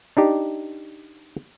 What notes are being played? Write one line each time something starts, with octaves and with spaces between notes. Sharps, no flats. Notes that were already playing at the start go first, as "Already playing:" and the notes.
D4 D#4 G4